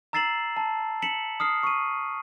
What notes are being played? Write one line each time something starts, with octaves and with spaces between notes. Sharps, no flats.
A#5 E6 A6 C7 E7 F#7
A5
B6 C#7 E7 F#7
D#6 F6 C7
C#6 D#7